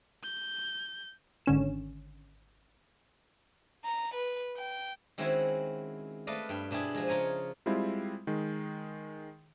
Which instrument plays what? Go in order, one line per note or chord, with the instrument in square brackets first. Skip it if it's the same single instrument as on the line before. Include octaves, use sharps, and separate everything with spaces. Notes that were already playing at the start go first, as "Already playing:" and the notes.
[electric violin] G6
[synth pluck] G#1 D3 C#4 E7
[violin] A#5
B4
G5
[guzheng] D#3 G#3 C4 C#4 E4 F#4
A3 B4 D5 D#5 F5
G2 G5
B2 D4 E4 G4 G#4
F3 G#3
C#3 F4 A#4 C#5 G#5
[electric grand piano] G3 G#3 C4 E4 F4
D#3 G#3